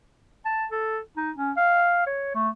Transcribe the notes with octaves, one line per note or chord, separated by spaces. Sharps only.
A5
A4
D#4
C#4
F5
C#5
A3